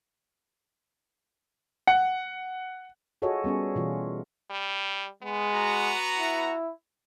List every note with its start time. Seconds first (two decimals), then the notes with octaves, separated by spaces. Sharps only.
1.87 F#5
3.22 F4 F#4 G#4 A4 C#5 D#5
3.44 G3 B3 C#4 G#4
3.76 B2 E3 F4
4.50 G3
5.23 G#3 B3
5.54 F#4 A#5
6.18 E4